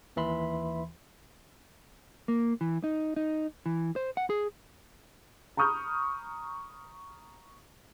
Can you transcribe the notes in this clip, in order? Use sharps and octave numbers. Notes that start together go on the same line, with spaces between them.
D#2 E3 E5 B5 C6
A#3
E3
D#4
D#4
E3
C5
F#5
G#4
A#5 B5 C#6 D#6 F6 G6